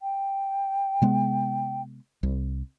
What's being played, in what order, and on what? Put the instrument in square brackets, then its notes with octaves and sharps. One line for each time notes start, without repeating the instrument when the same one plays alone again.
[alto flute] G5
[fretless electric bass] C3 G#3 B3
C2